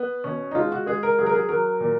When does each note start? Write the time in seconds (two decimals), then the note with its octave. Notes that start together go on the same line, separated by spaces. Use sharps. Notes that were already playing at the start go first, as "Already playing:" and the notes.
Already playing: B3
0.24 B2 C#4
0.51 D#4
0.55 G#3 F4
0.72 F#4
0.86 G#3 G#4
1.03 A#4
1.19 F#3 G#4
1.26 A#4
1.33 G#4
1.49 F#3 A#4
1.80 A#2